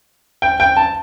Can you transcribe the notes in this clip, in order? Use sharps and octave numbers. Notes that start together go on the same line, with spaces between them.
G5
G5
A5